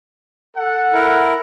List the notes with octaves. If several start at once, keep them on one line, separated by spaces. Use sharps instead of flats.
A4 F#5
E4 A#4